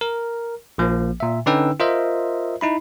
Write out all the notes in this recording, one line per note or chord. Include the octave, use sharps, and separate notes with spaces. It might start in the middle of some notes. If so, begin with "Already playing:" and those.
A#4
A#1 F3 A#3
A#2 E5
D3 C#4 D#4 B4 G5 E6
F4 A#4 C5 D#5 E5
D#4 E4 B5